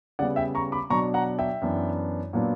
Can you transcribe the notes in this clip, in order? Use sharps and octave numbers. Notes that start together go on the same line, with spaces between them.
C#3 G3 B3 D5 F#5
E5 G5
A#5 C#6
B5 D6
B2 F#3 B3 D4 A#5 C#6
F#5 A#5
E5 G5
F#2 E3 B3 D4
A#2 F#3 B3 D4